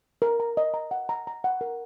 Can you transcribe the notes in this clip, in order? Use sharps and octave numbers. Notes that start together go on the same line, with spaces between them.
A#4
A#5
D#5
A#5
F#5
A#5
A#5
F#5
A#4